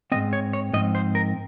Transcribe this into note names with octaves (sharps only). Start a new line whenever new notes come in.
G#2 F3 C4 D#5
C#5
C#5
G#2 F3 C4 D#5
C5
A#4